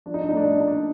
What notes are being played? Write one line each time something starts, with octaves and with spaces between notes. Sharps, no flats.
F3 D4
D#4
D4
D#4
A3 D4
D#4
D4
A#2 D#4
D4